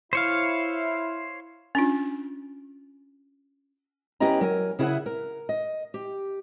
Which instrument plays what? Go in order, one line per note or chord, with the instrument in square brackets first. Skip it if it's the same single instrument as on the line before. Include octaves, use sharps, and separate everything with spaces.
[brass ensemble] E4 [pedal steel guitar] C5 C#5 F5
[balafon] C#4 D4 F4
[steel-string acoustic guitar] B3 C#4 E4 G4 D#5 A#5
F#3 A#4 G#5
C#3 E4 G#4 C#5 E5 F#5
A#4
D#5
G4